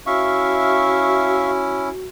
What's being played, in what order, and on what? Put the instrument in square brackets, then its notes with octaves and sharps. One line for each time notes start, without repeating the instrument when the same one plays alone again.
[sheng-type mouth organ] C#4 E4 [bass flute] F#4 [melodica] E5 F5 C#6